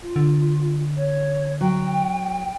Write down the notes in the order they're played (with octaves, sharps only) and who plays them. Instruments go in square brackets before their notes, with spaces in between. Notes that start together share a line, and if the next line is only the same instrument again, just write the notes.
[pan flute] F4
[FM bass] D3
[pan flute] C#5
[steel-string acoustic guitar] F#3 [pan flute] G5